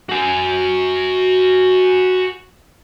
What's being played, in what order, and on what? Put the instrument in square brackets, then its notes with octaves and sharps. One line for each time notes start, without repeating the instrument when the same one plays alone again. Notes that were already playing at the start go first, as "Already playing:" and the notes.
[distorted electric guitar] F#4 G#5